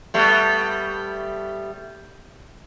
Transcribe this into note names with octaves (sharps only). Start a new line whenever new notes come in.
G3 A3 B3